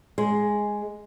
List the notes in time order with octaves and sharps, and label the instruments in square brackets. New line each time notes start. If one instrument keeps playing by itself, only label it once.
[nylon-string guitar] G#3